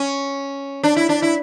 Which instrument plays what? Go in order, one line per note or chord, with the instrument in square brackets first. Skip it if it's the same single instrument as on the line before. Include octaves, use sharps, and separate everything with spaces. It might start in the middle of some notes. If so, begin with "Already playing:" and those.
Already playing: [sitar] C#4
D4
E4
D4
E4